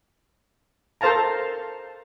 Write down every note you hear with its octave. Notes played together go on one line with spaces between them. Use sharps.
A4 A#4 C5 F5 A5 A#5